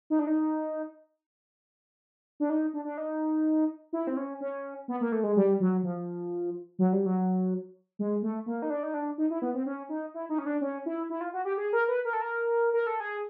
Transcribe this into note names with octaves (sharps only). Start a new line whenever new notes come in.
D#4
D4
D#4
D4
D#4
D4
D4
D#4
E4
C4
C#4
C#4
B3
A#3
A3
G#3
G3
F#3
F3
F#3
G3
F#3
G#3
A3
A#3
D#4
D4
D#4
D4
D#4
E4
B3
C4
C#4
D#4
E4
D#4
C#4
D4
C#4
E4
E4
F4
F#4
G4
G#4
A#4
B4
A#4
A4
A#4
A#4
A4
G#4